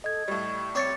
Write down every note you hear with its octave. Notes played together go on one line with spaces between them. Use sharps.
A4 D#5 G#6
A2 G3 C#6
C4 C#5 D6 A6 C#7